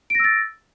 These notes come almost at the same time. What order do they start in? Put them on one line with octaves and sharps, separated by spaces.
D7 A#6 E6 A6